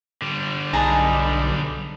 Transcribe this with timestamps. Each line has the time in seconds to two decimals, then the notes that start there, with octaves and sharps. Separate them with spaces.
0.22 D3 G3
0.73 B1 D4 D#4 G#4 A4 A#5 B5